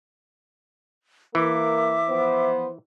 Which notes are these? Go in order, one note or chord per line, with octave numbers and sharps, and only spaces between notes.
E3 A#3 A#4 E5 D6
F3 B3 C5